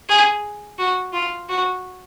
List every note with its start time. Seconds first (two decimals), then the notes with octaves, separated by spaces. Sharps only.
0.09 G#4
0.79 F#4
1.13 F4
1.49 F#4